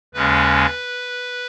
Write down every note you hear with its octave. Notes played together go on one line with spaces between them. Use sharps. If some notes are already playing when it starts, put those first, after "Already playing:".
D#2 C#3 G#3 C#4 B4